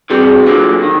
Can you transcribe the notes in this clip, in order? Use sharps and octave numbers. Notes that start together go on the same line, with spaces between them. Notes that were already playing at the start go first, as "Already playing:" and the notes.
C3 E3 G3 F#4 G#4
F#2 D3 F#3 A#3 F4 G4
D#3